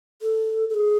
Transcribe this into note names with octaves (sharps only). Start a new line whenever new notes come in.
A4
A4
G#4